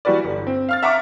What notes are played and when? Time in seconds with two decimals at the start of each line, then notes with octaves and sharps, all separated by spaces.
0.05 E3 G3 F#4 B4 D5
0.25 G1
0.47 C4
0.69 F5 F6 A6
0.83 E5 F#5 A#5 C#6 D6